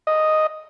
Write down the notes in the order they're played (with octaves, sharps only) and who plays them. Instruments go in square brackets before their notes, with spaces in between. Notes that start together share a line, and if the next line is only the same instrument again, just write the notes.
[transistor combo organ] D#5